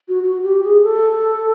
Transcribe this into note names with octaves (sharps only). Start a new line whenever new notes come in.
F#4
F#4
G4
G#4
A4